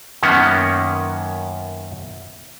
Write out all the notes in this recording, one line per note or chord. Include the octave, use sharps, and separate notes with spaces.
F#2 D#3 A#3 B3 C#4